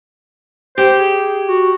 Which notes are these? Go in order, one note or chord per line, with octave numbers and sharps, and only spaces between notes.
G4 C5
G#4
F#4